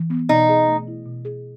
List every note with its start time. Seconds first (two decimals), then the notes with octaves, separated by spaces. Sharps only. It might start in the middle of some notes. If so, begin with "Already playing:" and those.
Already playing: E3
0.10 B3
0.29 B2 D#4
0.49 G#4
0.67 A3
0.88 E4
1.06 B2
1.25 G#4